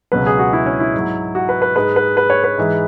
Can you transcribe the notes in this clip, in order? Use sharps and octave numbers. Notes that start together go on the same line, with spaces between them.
C#2 B2 F#3 B4
G#4
F#4
E4
C#4
E4
G#2 F#3
F#4
B4
B4
G#2 G#3 B4
B4
B4
C#5
B4
G#2 E3 G#3